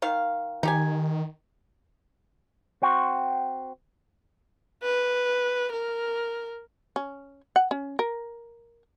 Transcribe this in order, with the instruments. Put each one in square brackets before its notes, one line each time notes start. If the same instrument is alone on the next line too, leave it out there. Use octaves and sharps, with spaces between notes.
[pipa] D#3 F5
[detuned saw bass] D#3 [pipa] D#4 G4 G#5
[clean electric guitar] C4 F#4
[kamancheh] B4
A#4
[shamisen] C#4
F#5
C#4
A#4